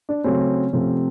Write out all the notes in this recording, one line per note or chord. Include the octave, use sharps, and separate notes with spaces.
D4
C#3 F#3 A3 C4 C#4
C3 F3 A3 C4